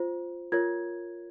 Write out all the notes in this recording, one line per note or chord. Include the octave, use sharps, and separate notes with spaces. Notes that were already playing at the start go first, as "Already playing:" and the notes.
Already playing: F4 C5
F4 A#4 C#5 G#6